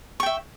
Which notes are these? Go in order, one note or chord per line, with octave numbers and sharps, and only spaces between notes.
E5 G5 C#6